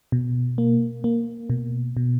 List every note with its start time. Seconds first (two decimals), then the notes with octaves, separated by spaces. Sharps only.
0.12 B2
0.58 A#3
1.04 A#3
1.50 B2
1.97 B2